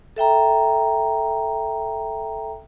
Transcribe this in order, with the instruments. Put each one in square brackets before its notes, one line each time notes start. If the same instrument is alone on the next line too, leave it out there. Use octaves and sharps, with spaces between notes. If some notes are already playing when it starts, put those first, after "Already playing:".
[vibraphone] A4 E5 G5 A#5